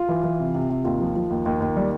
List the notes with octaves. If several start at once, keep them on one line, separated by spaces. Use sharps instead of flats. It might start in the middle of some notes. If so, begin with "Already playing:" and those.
Already playing: F4
E3
E3
C3
C3
C3
D#2 F4
F3
F3
D#2
D#2
D#2
G3